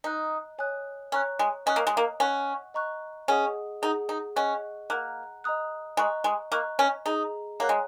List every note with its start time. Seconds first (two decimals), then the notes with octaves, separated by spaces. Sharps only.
0.04 D#4 D#5 A#5 F#6
0.58 C#5 G#5 D#6 F#6
1.12 C#4 C#5 A#5 C#6 F#6
1.39 G#3
1.66 C#4 D#5 G#5 D#6 F#6
1.76 A#3
1.87 G#3
1.97 A#3
2.20 C#4 F#5 C#6 F#6
2.74 D#5 A#5 C#6 F#6
3.28 C#4 G#4 D#5 F#5 D#6
3.82 D#4 G#4 F#5 D#6
4.09 D#4
4.36 C#4 D#5 F#5 C#6 F#6
4.90 A#3 F#5 A#5 F#6
5.44 D#5 A#5 D#6 F#6
5.97 G#3 D#5 A#5 C#6 F#6
6.24 G#3
6.52 A#3 D#5 A#5 C#6 F#6
6.79 C#4
7.06 D#4 G#4 D#5 A#5
7.60 A#3 C#5 F#5 A#5 F#6
7.69 G#3